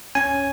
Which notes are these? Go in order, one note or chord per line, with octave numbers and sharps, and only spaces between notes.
C#4 G#5